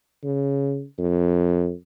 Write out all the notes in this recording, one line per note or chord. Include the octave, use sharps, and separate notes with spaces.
C#3
F2